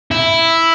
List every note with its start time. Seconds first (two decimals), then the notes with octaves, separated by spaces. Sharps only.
0.11 E4